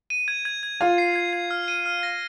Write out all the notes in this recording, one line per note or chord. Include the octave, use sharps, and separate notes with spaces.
D#7
G#6
G#6
G#6
F4 F5 G#6
C7
G#6
G#6
F6
D#7
F6
A#6